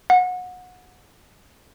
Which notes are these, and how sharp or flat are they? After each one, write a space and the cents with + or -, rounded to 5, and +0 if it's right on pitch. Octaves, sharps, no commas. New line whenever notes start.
F#5 -25